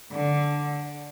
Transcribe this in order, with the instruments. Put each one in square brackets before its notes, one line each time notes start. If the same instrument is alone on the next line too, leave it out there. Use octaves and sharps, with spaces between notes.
[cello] D3